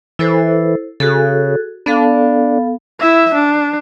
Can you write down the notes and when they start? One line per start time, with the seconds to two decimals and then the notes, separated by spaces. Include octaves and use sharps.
0.19 E3 E4 A4 C5
1.00 C#3 F#4 G#4 A4
1.86 B3 D4 A4 F5
3.00 E4 E5
3.34 D4